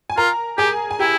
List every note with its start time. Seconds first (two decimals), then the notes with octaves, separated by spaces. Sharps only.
0.10 G#5
0.17 F4 A#4 A#5
0.58 G4 G#4 G#5
0.91 G#5
0.99 E4 G4 G5